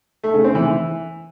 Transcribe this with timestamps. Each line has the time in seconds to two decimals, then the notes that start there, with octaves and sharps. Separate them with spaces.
0.24 A3
0.34 C#3
0.44 C4
0.55 E3
0.65 E3